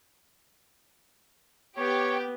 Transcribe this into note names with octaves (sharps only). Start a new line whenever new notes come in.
B3 G4 C#5